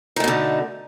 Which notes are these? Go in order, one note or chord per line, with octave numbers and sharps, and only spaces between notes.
B2 D3 A3 D#4